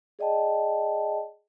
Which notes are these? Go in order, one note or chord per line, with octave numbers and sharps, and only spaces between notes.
G#4 D5 D#5 G5 A5